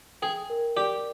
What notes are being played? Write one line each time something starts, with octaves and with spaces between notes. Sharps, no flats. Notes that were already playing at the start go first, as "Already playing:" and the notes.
G#4 G5
A#4
G4 D5